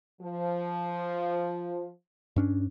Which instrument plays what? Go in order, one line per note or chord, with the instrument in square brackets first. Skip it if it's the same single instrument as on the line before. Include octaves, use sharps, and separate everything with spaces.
[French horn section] F3
[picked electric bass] G2 C#4 D4